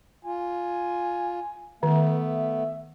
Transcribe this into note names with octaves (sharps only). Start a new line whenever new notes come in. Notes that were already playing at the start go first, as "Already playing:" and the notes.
F4 G#5
D#3 A3 B3 E5